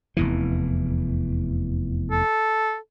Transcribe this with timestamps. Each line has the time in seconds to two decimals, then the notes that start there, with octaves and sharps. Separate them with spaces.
0.17 F1 E2 E3
2.12 A4